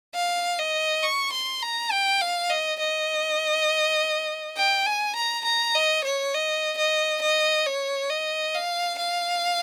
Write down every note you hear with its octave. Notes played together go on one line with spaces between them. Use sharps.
F5
D#5
C#6
C6
A#5
G5
F5
D#5
D#5
G5
G#5
A#5
A#5
D#5
C#5
D#5
D#5
D#5
C#5
D#5
F5
F5